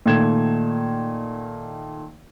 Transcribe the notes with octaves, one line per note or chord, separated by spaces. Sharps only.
A#2 D#3 A3 G#6 E7